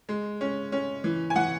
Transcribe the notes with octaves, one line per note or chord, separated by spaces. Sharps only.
G#3
C#4
C#4
E3
G#5
E3 F#5